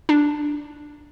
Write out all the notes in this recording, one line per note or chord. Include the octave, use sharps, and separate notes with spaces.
D4